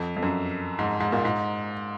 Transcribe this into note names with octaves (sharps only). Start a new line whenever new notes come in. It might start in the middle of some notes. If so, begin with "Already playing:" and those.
Already playing: F2
F2
F#2
G#2
G#2
A#2
G#2